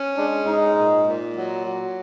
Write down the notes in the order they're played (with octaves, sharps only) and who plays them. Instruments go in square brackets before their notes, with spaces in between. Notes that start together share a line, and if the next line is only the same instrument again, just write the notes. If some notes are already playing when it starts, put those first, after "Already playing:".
Already playing: [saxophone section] C#4
[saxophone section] G#3 [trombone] D4
[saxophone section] G#2 [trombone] D#4
[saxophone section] A#2
A#2
F#3
F#3